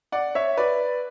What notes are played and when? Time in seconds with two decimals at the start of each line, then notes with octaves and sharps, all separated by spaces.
0.12 D5 F#5
0.35 C#5 E5
0.57 B4 D5